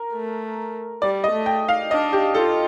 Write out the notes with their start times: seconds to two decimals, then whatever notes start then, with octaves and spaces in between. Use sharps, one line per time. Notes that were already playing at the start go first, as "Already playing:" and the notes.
Already playing: A#4
0.13 A3
1.02 G3 D5
1.24 D#5
1.31 A3
1.46 G5
1.69 F5
1.91 D4 D#5
2.13 G4
2.35 F4 A4